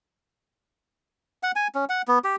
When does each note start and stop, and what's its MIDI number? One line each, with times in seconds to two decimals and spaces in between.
1.43 1.52 78
1.56 1.68 80
1.75 1.85 61
1.89 2.02 78
2.08 2.19 59
2.24 2.36 67